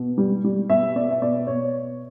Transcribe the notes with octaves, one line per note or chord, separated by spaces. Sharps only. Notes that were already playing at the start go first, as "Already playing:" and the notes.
Already playing: B2
G3
G3
B2 E5
B2 D5
E5
B2 D5
B2 C#5